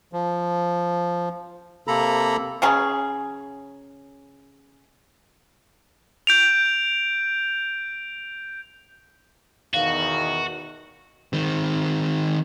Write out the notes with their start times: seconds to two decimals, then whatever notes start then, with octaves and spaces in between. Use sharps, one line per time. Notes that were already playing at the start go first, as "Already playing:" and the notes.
0.13 F3
1.88 C3 A#3 A4 A#5 B5
2.62 C#3 F#3 C#4 G#4
6.27 G6 D7 F7
9.74 E2 B2 D#3 F#4 F5
11.33 D#3 C4